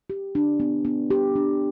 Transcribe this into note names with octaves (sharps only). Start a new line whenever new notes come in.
G4
D4
B3
B3
G4
D4